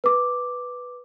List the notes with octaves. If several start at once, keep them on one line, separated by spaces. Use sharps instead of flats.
B4 D6